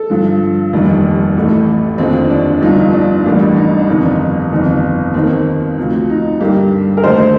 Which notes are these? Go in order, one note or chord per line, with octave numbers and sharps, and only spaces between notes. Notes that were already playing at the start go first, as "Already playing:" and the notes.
Already playing: A4
G2 D3 F3
F1 D#2 D#3 G3
A1 A2 A3
F1 D#2 D3 F3 C4
D4
G1 G2 D3 F3 D#4
D4
A1 A2 G3 A#3 D4
D#4
D4
G1 F2 C3 D#3 D#4
G1 F2 C3 D#3
D#2 D#3 A#3 C4
D2 C3 F3
D#4
G2 D3 G3 A#3 G4
A#4
D#2 D3 A3 C5